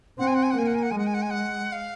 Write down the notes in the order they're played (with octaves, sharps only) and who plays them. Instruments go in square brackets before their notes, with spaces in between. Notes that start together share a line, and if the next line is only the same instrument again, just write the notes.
[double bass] C4 [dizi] F#5
[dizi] G#5
F#5
G#5
F#5
[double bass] A#3 [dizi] G#5
[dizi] F#5
G#5
F#5
G#5
[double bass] G#3 [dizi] F#5
[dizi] G#5
F#5
G#5
F#5
F5